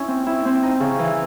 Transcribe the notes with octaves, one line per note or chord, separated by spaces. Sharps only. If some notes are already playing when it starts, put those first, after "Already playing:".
Already playing: C#4 E4
C4
E4
C4
D#4
C#3
E3